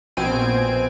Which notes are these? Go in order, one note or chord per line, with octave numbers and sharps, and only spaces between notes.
A#1 B2 C4 G#5 D7